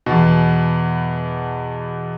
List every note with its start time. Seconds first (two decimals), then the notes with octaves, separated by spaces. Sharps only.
0.06 E2 B2